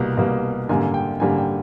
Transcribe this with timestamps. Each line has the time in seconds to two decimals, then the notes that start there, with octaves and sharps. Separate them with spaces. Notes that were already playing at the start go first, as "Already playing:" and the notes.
Already playing: C2 B2 G3 A#3
0.17 C2 B2 G3 A#3
0.69 G#1 F#2 D3 G3 A#3 G#5
0.94 G5
1.20 G#1 F#2 D3 G3 A#3 G#5
1.38 G5